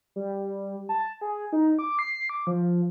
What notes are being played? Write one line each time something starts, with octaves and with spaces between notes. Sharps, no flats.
G3
A5
G#4
D#4
D6
C7
D6
F3